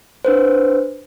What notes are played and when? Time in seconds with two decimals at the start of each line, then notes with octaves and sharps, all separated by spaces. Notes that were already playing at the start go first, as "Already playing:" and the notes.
0.25 D4 B4 C5